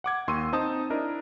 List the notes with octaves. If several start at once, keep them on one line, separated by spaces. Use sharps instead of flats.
F#5 D6 G#6
D#2 C6 C#6 E6 G#6 D#7
C4 D#4 C5 A5 D#6
D4 E4 A#4 D#5